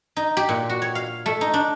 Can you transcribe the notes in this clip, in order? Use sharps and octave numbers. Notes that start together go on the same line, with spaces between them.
D#4
G4
A#2
F#4
C#5
F5
A3
D#4
D4